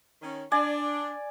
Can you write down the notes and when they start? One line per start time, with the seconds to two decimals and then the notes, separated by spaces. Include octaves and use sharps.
0.22 D#3 C#4
0.52 D4 D5 G#5